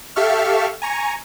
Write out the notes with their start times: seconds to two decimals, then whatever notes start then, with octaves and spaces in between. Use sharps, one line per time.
0.16 G4 A4 E5 F5 C#6 F6
0.82 G#5 A#5 C#6